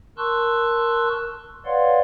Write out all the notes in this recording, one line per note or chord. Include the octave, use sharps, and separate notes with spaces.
A#4 A5 C6 C#6 E6 F#6
B4 C#5 D5 F5 F#5 C6